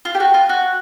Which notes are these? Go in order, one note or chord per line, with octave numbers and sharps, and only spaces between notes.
F4
G4
F#4
F4
F#4